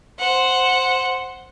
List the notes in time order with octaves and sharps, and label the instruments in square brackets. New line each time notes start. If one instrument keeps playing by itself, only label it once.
[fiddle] C5 F#5